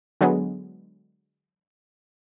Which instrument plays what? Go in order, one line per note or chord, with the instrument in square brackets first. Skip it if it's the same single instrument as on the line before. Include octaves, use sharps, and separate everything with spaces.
[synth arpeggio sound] D3 F#3 G#3 B3